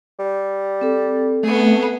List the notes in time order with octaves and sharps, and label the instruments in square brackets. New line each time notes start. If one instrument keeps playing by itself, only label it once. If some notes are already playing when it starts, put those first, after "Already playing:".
[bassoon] G3
[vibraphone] C4 A4
[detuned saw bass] A3 [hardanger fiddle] B3 G#4